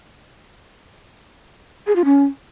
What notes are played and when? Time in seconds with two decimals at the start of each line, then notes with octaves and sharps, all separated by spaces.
1.87 G#4
1.96 F4
2.05 C#4